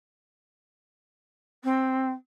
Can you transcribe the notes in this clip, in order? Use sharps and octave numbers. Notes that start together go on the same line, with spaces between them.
C4